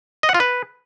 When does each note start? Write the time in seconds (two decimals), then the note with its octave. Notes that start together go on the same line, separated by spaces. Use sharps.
0.23 D#5
0.29 F#5
0.34 F4
0.40 B4